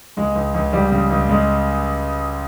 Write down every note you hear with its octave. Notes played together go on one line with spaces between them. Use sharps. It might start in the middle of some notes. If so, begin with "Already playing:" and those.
C#2 G#3
C#2
C#2
C#2 G3
C#3
C#2
C#3 G#3